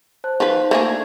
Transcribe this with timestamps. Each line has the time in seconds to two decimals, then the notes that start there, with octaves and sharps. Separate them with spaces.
0.24 C5 A5 F#6
0.40 F3 D#4 B4 C5
0.71 A3 A#3 G#4 E5 D6
0.85 D4 D5 G#6